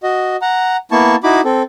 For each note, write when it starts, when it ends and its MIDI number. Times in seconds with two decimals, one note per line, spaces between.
0.03 0.36 66
0.03 0.36 75
0.42 0.77 78
0.42 0.77 82
0.92 1.16 58
0.92 1.16 59
0.92 1.16 64
0.92 1.16 81
0.92 1.16 85
1.24 1.41 63
1.24 1.41 64
1.24 1.41 66
1.24 1.41 83
1.24 1.41 86
1.45 1.63 60
1.45 1.63 69